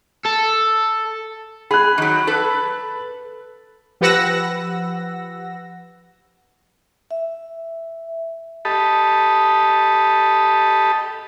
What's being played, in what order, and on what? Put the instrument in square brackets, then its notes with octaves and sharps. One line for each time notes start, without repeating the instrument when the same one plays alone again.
[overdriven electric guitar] A4
[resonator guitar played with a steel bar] G#4 [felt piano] B5 F#6
[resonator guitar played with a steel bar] D#3 F#3
A4 B4
[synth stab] F3 G4 B4 F#5 E6 A#6
[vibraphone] E5
[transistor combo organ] G4 A4 D#5 A5 B5